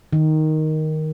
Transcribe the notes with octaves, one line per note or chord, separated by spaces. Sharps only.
D#3